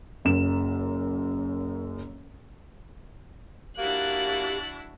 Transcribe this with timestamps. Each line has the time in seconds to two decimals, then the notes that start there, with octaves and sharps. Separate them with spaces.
0.25 F#1 F#2 E7
3.78 A#3 D4 E4 F#4 G4 F#6 A6